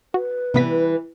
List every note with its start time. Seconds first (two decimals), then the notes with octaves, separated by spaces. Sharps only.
0.14 F#4 B4
0.54 C3 E3 G3 B3 B6